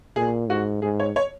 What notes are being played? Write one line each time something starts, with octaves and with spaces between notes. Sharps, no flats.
A#2 G#4
G#2 F#4
G#2 G#4
C#5
C#5